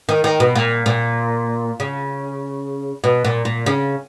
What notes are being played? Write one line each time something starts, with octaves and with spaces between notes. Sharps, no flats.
D#3
D#3
B2
A#2
A#2
C#3
B2
A#2
A#2
C#3